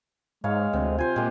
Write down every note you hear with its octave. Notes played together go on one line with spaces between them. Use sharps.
G#2 G#3 C#5 F5
D2 C3
F4 C5 G#5
A#2 G#3 G4